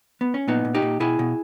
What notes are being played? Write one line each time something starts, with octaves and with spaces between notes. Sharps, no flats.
B3
C#4
A#2 B3 D#4
A#2
D#4 G4
A#2
B2 E4 G#4
B2